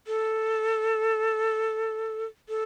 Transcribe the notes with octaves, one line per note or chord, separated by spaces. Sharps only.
A4
A4